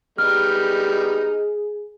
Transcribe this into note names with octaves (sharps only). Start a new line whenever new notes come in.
G3 B3 D#4 G#4 F6